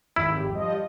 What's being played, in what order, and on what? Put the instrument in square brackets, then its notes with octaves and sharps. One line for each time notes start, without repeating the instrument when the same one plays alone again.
[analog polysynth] G#1 F2 G4 [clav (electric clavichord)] E4
[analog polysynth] F3 G3 D#5